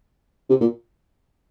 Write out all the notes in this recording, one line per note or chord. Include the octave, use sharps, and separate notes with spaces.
C3
A#2